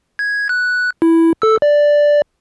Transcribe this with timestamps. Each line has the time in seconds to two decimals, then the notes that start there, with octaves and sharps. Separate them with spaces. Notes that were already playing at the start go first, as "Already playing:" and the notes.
0.19 G#6
0.49 F#6
1.02 E4
1.42 A4 E6
1.62 D5